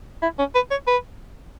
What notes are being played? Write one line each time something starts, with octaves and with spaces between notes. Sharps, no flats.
E4
C#4
B4
C#5
B4